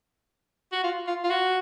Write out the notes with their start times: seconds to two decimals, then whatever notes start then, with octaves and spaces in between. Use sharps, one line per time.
0.72 F#4
0.84 F4
1.07 F4
1.24 F4
1.30 F#4